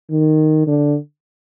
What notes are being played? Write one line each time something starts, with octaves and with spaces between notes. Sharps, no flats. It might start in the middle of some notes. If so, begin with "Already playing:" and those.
D#3
D3